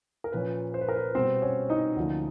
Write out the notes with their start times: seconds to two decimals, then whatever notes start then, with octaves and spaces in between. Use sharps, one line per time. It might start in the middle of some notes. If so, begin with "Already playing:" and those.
0.24 A#4
0.32 A#2 F3 A#3 C#4 B4
0.74 C5
0.81 B4
0.89 A#4
0.96 B4
1.15 B2 G3 B3 C4 C5
1.42 C#4 C#5
1.70 D#4 D#5
1.96 D2 D3 F3 A#3 C#4